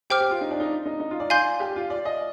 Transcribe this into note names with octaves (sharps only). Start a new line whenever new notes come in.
G4 C5 G5 D6 F6
G4
F4
D#4
D4
D#4
D#4
D#4
F4
D5
D5 F5 G#5 C6 G6
G4
F4
D5
D#5